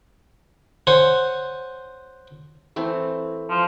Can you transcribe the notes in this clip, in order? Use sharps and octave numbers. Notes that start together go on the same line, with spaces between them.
C5 C#5 F#5 G#5
E3 A3 C4
F3